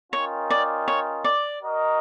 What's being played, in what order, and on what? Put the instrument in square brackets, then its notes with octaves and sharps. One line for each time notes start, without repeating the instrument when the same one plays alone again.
[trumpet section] C#4 F4 A#4 D#5 G5 [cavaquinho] C#5
[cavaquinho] D5
C#5
D5
[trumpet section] F#4 A#4 D#5